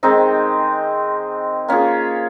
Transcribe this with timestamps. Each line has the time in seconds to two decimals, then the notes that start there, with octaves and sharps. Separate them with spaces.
0.03 D#3 G#3 C4 D#4
1.68 A#3 C#4 F4 G#4